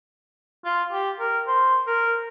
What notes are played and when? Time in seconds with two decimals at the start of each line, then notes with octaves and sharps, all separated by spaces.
0.64 F4
0.92 G4
1.19 A#4
1.47 C5
1.87 A#4